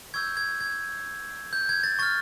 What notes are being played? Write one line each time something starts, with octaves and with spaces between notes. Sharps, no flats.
C#6 E6 G6 G#6
G#6
G#6
G6
G#6
A6
C#6 F6 A6